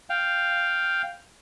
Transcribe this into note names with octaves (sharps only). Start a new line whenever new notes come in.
F5 G5